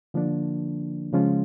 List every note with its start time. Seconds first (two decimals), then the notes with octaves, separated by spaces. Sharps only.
0.14 D3 F3 A#3 D4
1.13 C#3 F3 G#3 C#4 F4